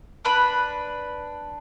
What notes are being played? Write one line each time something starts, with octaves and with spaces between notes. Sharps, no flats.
D4 B4 B5